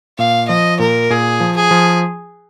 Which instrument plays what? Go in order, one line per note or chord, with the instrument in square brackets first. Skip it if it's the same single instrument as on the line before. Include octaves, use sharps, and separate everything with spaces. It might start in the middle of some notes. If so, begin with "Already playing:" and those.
[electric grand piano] A#2 [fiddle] F5
[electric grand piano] F3 [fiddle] D#5
[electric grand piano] A#2 [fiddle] A#4
[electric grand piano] A#2 [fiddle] G#4
[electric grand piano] F3
[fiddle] G#4
[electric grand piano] F3